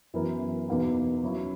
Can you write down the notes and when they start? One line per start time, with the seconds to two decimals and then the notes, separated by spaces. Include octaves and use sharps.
0.14 F#2 E3 B3 E4 A#4
0.68 E2 B2 A#3 D#4
1.23 F#3 C#4 E4